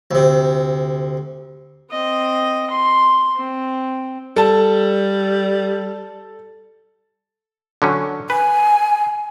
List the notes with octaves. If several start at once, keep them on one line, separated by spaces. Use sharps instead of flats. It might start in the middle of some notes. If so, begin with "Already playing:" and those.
D2 C3
C4 D#5
C6
C4
G3 A4 A5
D3 F#3 C#4
B4 G#5